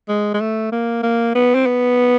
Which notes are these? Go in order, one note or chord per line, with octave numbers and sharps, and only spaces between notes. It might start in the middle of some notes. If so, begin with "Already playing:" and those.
G#3
G#3
A3
A#3
A#3
B3
C4
B3